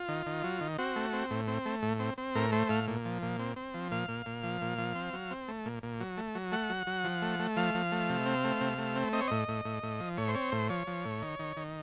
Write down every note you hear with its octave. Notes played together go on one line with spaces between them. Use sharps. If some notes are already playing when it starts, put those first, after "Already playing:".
Already playing: F4
D#3
D#3
F#3
D#3
C4 F#4
A3
C4
A2
C4
A3
A2
C4
C4
A2 A#4
A3 C5
A2 F5
A#2
F3
A#2
C4
C4
F3
A#2 F5
A#2
A#2
F3
A#2
F3
C4
F#3
C4
A3
A#2
A#2
F#3
A3
F#3
A3 F#5
F#3
F#3
F3
A3
A3
F3 F5
F3
A3
C3
C4
A3
C3
A3
C4
C4 D#5
C#5
A2 D#5
A2
A2
A2
F3
A2 C#5
C5
C4 C#5
A2 C5
F3 C#5
F3
A2
D#3
D#3
D#3